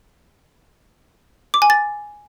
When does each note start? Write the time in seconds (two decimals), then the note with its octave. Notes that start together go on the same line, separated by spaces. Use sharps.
1.54 D6
1.62 G#5
1.70 A6